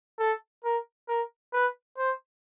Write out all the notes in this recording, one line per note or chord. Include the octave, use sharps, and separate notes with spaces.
A4
A#4
A#4
B4
C5